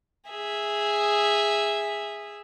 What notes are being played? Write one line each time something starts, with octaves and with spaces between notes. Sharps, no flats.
G#4 E5